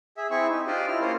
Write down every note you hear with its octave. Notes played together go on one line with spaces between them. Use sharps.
G#4 E5
C4 E4 G#4 E5 C#6
D#4
D4 F4 G4 C5 D5 D#5
E4 F6
A#3 C#4 F4 A#4 C5